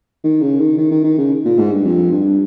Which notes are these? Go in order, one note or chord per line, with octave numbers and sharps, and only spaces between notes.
D#3
C#3
D#3
D#3
D#3
D#3
C#3
A#2
G#2
G2
F2
G2